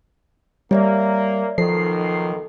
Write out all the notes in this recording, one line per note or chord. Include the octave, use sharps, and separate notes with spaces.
G3 A#3 C#5 D5 E5
B1 D#3 F3 A4 C7